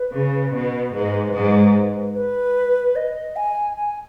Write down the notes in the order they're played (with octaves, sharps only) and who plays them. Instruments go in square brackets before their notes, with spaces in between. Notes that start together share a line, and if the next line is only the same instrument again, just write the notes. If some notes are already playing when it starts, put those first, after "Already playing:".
Already playing: [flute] B4
[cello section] C#3
B2
G#2
G#2
[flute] B4
D#5
G#5
G#5